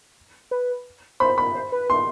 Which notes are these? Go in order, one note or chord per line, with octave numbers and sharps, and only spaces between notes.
B4
C5 B5
B5
C5
B4
C6